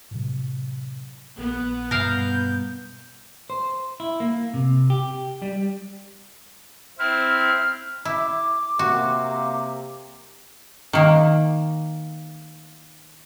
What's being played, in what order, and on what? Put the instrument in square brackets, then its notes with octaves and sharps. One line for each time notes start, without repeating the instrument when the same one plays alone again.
[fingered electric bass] A2 C3 F#3
[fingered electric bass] A#1 [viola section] B3
[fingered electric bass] G2 B2 [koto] A#4 F5 [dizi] G6
[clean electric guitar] C5
E4
A#3
C3
G4
G3
[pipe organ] C4 E4 [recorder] F6
[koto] E4 [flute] D6
[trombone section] C3 A#3 [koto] F#4
[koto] D#3 A#3